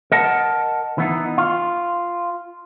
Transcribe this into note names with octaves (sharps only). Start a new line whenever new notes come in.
A#4 D#5 F#5 A5
E3 B3 D#4
F4